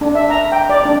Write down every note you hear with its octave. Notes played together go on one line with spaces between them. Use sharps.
D4
E5
A#5
G5
D5
D4